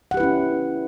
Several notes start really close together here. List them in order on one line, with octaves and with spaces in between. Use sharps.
F#5 G4 B4 E4 C#4